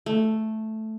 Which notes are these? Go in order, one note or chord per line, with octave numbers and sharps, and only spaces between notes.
A3